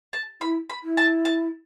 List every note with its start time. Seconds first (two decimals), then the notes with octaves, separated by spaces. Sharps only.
0.13 A5
0.41 E4 B5
0.70 B5
0.84 E4
0.97 A5
1.25 A5